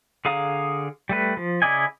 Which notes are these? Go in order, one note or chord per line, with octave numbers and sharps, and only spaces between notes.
D3 G#4 F5 A#5 D#6
G3 A3 B4
F3
C#3 E4 D5 D#5 G#5